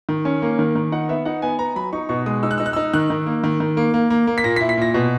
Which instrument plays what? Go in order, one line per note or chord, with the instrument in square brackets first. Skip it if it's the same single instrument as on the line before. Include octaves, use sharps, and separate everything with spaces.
[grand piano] D#3
C#4
A#3
D#3
D#3
D#4 F#5
B3 E5
D#4 F#5
B3 G#5
B3 A#5
F#3 B5
D#4 C#6
B2 C#6
G#3 D#6
D#4 E6
F#6
D#4 E6
F#6
D#4 E6
D#3 F#6
D#3
A#3
D#3
D#3
A#3
A#3
A#3
A#3
B6
A#2 A#6
B6
E4
B6
A#2 A#6
B2